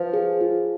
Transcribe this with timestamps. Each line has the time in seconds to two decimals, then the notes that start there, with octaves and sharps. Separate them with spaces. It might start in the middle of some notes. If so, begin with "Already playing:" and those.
Already playing: F3 B4
0.13 G#4
0.41 F4